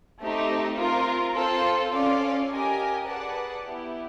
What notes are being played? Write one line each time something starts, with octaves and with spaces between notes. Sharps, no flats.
A3 C4 D#4 G4
C4 F4 A#4
C4 F4 A4 C5
C#4 F4 A4 D5 F5
G4 A#4 D#5 G#5
G#4 B4 D5 F#5 A5
B3 E4 G4